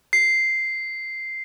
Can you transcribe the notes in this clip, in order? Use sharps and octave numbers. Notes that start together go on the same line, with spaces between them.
C7